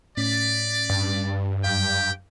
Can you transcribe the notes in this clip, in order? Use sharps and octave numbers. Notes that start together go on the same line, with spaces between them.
A2 C#4 D5 B6
G2
F#2 G4 F5 G5